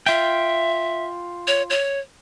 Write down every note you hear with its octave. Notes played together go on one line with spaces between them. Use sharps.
F4 E5 G5
C#5
C#5